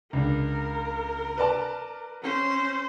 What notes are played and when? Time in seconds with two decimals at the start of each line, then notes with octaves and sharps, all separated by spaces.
0.13 C#2 D4 A#4
1.38 B4 D5 A5
2.22 C#4 C5